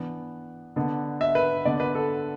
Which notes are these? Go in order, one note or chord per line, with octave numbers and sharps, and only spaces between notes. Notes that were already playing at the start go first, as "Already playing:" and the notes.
Already playing: E3 B3 D4
D3 B3 D4
E5
B4
D3 B3 D4 D5
B4
A4